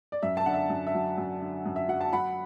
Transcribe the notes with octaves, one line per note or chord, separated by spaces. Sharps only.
D5
F#2 E5
A5
D3 F#5
E5
F#2
E5
F#3
F#2
D3
F#2
E5
F#3 F#5
A5
F#3 F#5 B5